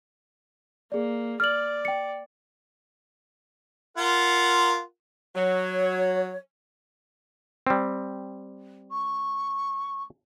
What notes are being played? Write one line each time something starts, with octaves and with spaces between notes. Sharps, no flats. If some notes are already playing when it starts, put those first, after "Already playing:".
A#3 G#4 D5
D5 F6 F#7
G5 C#7
F4 A#4 F#5
F#3 C#5
G3 C4
C#6